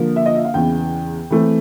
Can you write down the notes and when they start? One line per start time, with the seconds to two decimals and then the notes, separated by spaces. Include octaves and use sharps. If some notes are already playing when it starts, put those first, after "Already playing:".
Already playing: D3 F3 A#3
0.16 E5
0.26 D#5
0.35 E5
0.45 F5
0.54 E2 C#3 E3 G5
1.31 E3 A3 C4